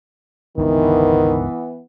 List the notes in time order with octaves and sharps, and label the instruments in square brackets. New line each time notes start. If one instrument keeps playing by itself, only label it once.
[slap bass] G1 C#2 D4 [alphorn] D#3 [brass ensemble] E3 B3